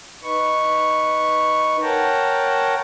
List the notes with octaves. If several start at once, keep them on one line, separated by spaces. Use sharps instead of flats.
D#4 B4 C#6
A#4 C#5 F#5 G5 A5 A#5